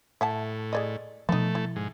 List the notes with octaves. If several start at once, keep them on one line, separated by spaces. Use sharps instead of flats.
A2 E5 F#5 A5
G#4 D5 D#5
B2 F3 A3 B3 D#4
E4
G#2